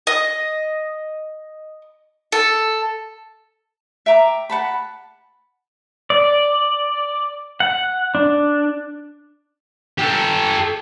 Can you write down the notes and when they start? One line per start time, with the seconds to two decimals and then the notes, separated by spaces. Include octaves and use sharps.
0.07 D#5
2.32 A4
4.06 E5 G5 A#5 D6
4.50 F#5 A5 B5
6.10 D5
7.60 F#5
8.15 D4
9.98 G4 A4